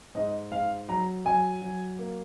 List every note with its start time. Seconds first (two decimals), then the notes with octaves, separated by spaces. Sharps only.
0.15 G#2 D#5
0.52 G#2 F5
0.88 F#3 A#5
1.25 F#3 G#5
1.62 F#3
1.99 A#3